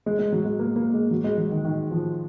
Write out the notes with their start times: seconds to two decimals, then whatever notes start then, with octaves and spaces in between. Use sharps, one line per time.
0.06 G#3
0.19 G#3
0.33 F#3
0.45 G#3
0.59 A#3
0.76 A#3
0.94 G#3
1.11 F#3
1.24 G#3
1.38 F#3
1.51 D#3
1.65 D#3
1.91 F3